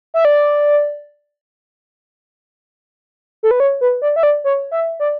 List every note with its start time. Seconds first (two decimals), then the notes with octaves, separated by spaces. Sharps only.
0.14 E5
0.25 D5
3.43 A4
3.51 B4
3.60 C#5
3.81 B4
4.02 D5
4.16 E5
4.23 D5
4.44 C#5
4.71 E5
5.00 D5